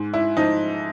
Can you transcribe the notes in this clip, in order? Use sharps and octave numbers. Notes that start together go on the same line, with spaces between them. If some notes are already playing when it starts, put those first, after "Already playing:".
Already playing: G#2
E4
F3 D#4